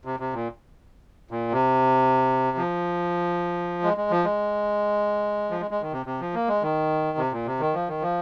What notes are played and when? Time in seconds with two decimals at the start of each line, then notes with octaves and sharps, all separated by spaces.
0.05 C3
0.20 C3
0.33 A#2
1.31 A#2
1.52 C3
2.57 F3
3.83 G#3
3.97 G#3
4.11 F3
4.24 G#3
5.50 F3
5.61 G#3
5.71 G#3
5.82 D#3
5.92 C3
6.06 C3
6.20 F3
6.34 A#3
6.48 G#3
6.62 D#3
7.18 C3
7.32 A#2
7.47 C3
7.60 D#3
7.74 F3
7.88 D#3
8.02 F3